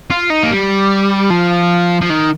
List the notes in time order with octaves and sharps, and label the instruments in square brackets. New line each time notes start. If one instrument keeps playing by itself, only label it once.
[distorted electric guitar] F4
D#4
A#3
G3
F3
F3
D#3